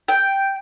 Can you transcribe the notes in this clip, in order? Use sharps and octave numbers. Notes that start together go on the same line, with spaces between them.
G5